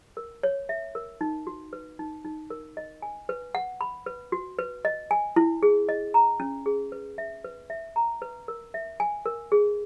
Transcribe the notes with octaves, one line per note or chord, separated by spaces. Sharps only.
A#4
C#5
E5
A#4
D#4
F#4
B4
D#4
D#4
A#4
D#5
G#5
B4
F#5
B5
B4
F#4
B4
D#5
G#5
E4
G#4
D#5
A#5
C#4
G#4
B4
E5
B4
E5
A#5
B4
A#4
E5
G#5
A#4
G#4